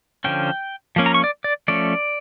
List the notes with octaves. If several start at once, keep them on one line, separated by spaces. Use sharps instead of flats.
D3 F3 C#4 G5
F3 A#3 C#4
A#5
C#6
D5
D5
F3 A3 C#4 D5